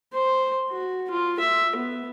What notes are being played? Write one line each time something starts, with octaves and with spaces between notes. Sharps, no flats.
C5
F#4
F4
E5
B3